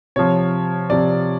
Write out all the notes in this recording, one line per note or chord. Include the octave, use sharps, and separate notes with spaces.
C3 F3 C#5
C3 F3 D5